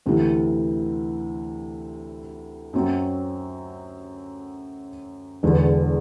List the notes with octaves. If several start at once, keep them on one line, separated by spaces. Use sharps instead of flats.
D2 C3 E3
F#2 F#3 C4
E1 E2 D3